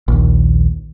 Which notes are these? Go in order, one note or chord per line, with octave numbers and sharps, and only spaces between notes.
A#1 D#2